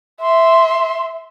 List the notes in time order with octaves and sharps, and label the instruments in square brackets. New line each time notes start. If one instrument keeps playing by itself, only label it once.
[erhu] E5 [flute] C6